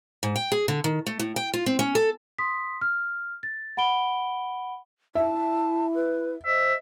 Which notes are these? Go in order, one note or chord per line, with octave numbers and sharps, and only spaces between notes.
G#2
G5
G#4
D3
D#3
A3
A2
G5
F4
C4
C#4
A4
C6 D#6 B6
F6
A6
F#5 B5 D7 G7
E4 E5 A5
B4
C5 D#5 E5